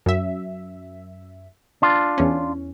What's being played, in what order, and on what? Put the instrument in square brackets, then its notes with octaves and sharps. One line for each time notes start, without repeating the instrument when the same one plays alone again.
[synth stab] F#2 E5
[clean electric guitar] D4 F4
[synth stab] E2 C#4